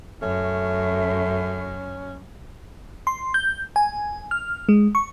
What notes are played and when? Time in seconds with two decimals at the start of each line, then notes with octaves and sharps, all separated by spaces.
0.22 F#2 A3 C#4
3.07 C6
3.34 G6
3.76 G#5
4.31 F6
4.69 G#3
4.95 C#6